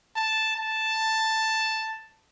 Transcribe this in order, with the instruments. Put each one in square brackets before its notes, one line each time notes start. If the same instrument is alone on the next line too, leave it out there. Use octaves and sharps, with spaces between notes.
[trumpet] A5
A5